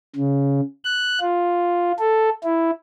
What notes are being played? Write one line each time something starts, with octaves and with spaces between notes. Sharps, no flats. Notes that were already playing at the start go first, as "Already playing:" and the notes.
C#3
F#6
F4
A4
E4